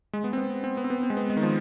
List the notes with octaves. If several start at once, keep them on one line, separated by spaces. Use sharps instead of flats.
G#3
B3
C4
B3
C4
B3
C4
B3
C4
G#3
B3
G#3
D#3
F3